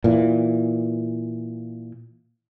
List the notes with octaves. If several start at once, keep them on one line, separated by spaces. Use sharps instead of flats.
A#2 E3